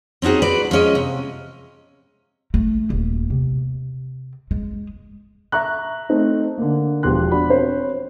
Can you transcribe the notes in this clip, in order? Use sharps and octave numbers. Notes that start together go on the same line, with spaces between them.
C4 C#4 D#4 F#4 G#4
F#4 B4 D5
F3 G#3 C#4 D#5
C3
A3
D#1
C3
G#3
E5 A#5 C#6 F#6
A3 C4 D#4
D3 A#3
E1 F3 G4 C6 F#6
D4 F#4 B5
C4 C5 C#5